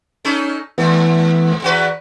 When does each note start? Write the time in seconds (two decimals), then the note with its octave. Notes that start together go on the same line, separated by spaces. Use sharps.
0.25 C#4 D#4 A4
0.78 G#2 E3 A3 B3
1.62 E2 F#4 B4